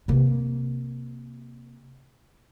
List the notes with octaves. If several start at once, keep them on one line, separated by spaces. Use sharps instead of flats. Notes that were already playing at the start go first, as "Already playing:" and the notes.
C3 A#3